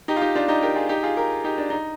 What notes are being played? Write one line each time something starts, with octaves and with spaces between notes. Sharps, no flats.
D#4 G4
F4
D#4 G4
D4 F4
D#4 G4
G4 A#4
F4 G#4
D#4 G4
F4 G#4
G4 A#4
D#4 G4
D4
D#4